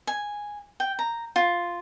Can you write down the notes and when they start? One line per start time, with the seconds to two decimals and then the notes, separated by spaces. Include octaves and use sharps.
0.07 G#5
0.80 G5
0.99 A#5
1.36 F4